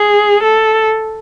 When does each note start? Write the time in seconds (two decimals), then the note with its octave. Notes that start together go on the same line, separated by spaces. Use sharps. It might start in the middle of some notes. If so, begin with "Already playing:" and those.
Already playing: G#4
0.43 A4